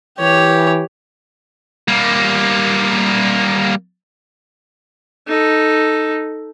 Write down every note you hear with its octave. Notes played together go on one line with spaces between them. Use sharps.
E3 G4 C#5
G3 A#3
D#4 A4